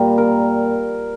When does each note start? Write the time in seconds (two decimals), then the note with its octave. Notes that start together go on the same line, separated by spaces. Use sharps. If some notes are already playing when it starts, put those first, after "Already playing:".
Already playing: A#2 G3
0.18 A#4